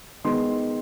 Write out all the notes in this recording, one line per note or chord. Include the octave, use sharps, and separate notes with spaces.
D#3 G#3 B3 D#4 C6